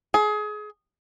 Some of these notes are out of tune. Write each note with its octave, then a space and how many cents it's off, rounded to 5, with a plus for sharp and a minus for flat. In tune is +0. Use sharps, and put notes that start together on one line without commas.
G#4 +25